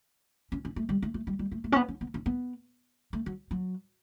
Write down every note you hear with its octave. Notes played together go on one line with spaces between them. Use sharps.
C#4
C#4
A3
G3
A3
A3
G3
G3
A3
A3
C#4
B3
C#4
B3
C#4
B3
A3
F#3
F#3